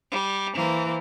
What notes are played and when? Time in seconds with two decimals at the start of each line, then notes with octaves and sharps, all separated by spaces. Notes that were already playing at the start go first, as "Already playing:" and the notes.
0.10 G3
0.55 E3 A#3 C5